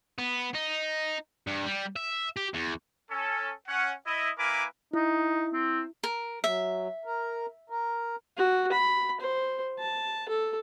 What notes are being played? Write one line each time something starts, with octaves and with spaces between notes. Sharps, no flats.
B3
D#4
G2
G3
E5
G4
E2
C#4 A4
C#4 F#5
E4 D#5
A#3 E4 A#4 B4 G#5 D6
D#4 E4
C4
A#4
F#3 E5
A#4
A#4
F#4
B5
C5
A5
A4